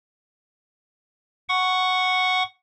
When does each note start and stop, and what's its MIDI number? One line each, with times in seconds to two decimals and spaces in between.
1.49 2.43 78
1.49 2.43 85